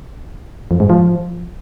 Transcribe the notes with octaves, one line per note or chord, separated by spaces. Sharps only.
F2
G#2
F3